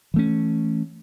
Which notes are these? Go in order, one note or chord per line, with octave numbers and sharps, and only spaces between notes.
E3 A3 C#4